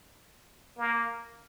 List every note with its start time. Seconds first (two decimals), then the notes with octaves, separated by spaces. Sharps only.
0.78 A#3